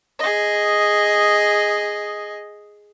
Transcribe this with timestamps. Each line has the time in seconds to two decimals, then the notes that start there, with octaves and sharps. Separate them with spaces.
0.19 G#4 D#5